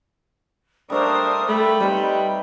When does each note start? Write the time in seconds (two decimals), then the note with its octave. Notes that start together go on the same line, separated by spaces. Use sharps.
0.90 G3 A3 A#3 D4 A#4 C5 D#6
1.48 A3 G5 B5
1.80 G3 C4 D#4 B4